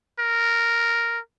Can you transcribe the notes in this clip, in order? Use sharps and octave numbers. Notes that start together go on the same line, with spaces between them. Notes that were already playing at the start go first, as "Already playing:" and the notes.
A#4